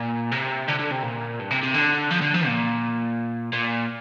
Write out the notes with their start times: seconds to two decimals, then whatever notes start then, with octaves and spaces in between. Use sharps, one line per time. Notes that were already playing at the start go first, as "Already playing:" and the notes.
Already playing: A#2
0.32 C3
0.68 D3
0.79 D3
0.91 C3
1.03 A#2
1.39 G2
1.51 C3
1.63 C3
1.74 D3
2.11 F3
2.22 D3
2.34 F3
2.46 A#2
3.53 A#2